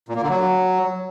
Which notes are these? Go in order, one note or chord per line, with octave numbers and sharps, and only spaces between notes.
A#2
A#3
D3
F#3